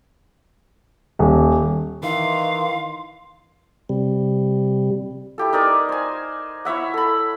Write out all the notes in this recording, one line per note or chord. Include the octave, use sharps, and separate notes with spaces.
D#1
D#3 E3 F5 C6
C3 G3
E4 G4 A4
D#4 A#4 D5 G#5
C5 G#5
E4 C#5 E5 F#5
A4 B5